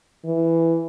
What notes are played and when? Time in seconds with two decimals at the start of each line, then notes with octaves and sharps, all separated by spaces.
0.25 E3